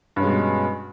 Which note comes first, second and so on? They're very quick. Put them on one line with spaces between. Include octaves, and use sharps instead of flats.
G2 C#4 G#3 B2